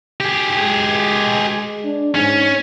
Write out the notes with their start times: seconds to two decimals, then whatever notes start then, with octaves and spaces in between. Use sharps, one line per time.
0.20 G4 G#4
0.59 G#3
1.85 D4
2.15 G#2 C#4